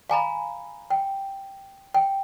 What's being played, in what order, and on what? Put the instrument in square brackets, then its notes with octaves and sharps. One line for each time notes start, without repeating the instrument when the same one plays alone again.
[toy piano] F5 G#5 A#5 B5
G5
G5